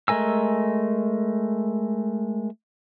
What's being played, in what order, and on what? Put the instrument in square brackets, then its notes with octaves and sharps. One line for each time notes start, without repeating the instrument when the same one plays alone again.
[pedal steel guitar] G#3 A3 A#4 G#5 E6